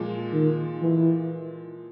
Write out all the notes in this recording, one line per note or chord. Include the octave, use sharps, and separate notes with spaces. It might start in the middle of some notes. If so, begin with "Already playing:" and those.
Already playing: A#2 F3 G#3
D#3
E3